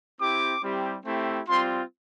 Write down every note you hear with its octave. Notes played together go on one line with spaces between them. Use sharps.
C4 E4 G4 D6
G3 C4 E4 G4
A3 C4 E4 G4
G3 C4 F4 C6